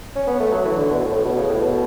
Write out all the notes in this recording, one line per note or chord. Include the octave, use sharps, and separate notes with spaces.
C#4
B3
A3
F#3
E3
D3
B2
A2
A2
B2
C#3
A2
B2